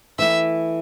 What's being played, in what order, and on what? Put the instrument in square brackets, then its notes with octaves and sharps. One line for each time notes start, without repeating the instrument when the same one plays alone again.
[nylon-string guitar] E3 A3 E4 [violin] E5